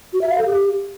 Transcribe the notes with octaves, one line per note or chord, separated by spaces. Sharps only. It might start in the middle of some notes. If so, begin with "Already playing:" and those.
F#4
E5
F5
A4
G4